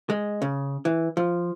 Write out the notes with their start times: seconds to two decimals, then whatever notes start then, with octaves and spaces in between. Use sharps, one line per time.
0.10 G#3
0.42 C#3
0.85 E3
1.17 F3